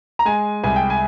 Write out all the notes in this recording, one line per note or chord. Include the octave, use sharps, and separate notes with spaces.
A#5
G#3 G#5
C2 G#5
G5
G#5